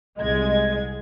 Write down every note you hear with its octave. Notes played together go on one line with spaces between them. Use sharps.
C2 G#3 D#5 G#6